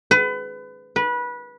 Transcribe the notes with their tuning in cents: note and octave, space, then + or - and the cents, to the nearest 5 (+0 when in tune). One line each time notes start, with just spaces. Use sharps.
B4 +30
B4 -20